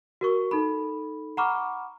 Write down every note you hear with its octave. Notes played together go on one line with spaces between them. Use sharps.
F#4 A#4 C#6
D#4 A4 B5
F#5 A#5 B5 C#6 D6 F6